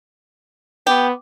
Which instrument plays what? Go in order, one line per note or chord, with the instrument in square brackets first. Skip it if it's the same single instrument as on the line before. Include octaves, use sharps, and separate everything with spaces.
[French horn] B3 [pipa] G4